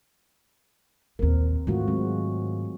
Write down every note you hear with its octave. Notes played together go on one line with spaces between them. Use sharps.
A#1 D#2 C4 A#4
G#2 D#3 A3 F4 F#4
F#3 G#3 C4